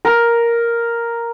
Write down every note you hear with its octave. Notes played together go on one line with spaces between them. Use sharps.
A#4